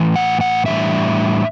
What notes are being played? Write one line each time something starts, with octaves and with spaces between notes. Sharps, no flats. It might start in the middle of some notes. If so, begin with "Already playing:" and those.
Already playing: A2 E3
F#5
F#5
A2 E3 G3 D4 E5